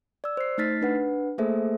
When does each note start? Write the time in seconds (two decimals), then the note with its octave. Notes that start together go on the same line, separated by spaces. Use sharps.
0.24 D5 E6
0.37 C5 C7
0.58 A3 D#4 F6 A6 B6 C7
0.82 D4 B4 F#5
1.38 A3 A#3 G#4 A4 C5 E5